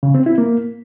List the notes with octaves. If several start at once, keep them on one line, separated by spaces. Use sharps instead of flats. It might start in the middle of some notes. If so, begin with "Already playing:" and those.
C#3
C4
E4
A#3